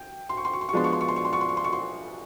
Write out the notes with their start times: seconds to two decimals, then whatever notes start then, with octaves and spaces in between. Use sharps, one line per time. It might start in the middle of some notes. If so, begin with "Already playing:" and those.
Already playing: G5
0.29 C6
0.37 C#6
0.45 C6
0.53 C#6
0.61 C6
0.69 C#6
0.73 F3 G#3 B3 D4 C6
0.84 C#6
0.93 C6
1.01 C#6
1.08 C6
1.16 C#6
1.25 C6
1.33 C#6
1.41 C6
1.49 C#6
1.57 C6
1.64 C#6
1.73 C6